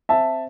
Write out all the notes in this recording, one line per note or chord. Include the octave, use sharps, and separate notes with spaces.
C4 E5 A5